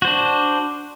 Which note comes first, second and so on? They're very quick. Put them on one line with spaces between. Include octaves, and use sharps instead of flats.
F#4 C5 D4